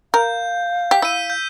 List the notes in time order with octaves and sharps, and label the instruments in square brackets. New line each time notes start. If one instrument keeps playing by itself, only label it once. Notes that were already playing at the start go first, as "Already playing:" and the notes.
[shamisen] A#4 [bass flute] F5 [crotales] G6
[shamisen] G4 [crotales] B6
[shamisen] E4 [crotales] E6 D#7
[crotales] G6